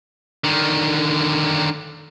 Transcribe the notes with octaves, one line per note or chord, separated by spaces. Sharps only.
D3 D#3